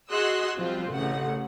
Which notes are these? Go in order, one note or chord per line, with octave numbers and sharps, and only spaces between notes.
F#4 G#4 D#5 C6 E6 F#6
F3 G3 C4 F4
A1 C#3 F#5